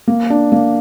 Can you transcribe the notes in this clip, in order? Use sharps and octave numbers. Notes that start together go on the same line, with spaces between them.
A#3
D4
A#3